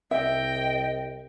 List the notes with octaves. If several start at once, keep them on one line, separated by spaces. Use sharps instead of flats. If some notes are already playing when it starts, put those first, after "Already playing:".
C2 D#5 E5 G5